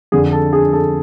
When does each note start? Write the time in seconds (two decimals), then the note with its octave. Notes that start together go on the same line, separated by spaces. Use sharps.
0.12 F2 D3 G#4
0.32 A4
0.53 G#4
0.73 A4